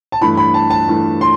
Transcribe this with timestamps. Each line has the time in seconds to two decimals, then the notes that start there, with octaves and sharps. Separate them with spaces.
0.12 A5
0.21 G2 E3 A3 B5
0.37 B5
0.54 A5
0.70 A5
0.88 G2 E3 A3
1.21 C6